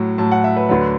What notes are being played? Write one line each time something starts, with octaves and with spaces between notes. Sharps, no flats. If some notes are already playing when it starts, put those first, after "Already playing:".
Already playing: A2 F#3
A2 F#3 A5
F#5
E5
B4
D2 D3 F#3 B4